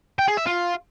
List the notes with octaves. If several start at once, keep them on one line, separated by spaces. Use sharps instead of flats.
G5
G#4
E5
F4